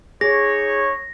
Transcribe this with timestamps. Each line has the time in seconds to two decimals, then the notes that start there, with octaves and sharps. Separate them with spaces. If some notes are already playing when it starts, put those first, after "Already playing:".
0.21 D#4 G#4 C#5 A#6